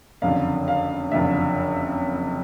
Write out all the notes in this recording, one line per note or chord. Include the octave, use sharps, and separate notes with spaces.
F#1 F2 D3 F5
F5
F#1 F2 D3 E5